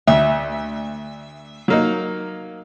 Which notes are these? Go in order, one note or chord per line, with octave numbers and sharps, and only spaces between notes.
D2 E5
F#3 A#3 D#4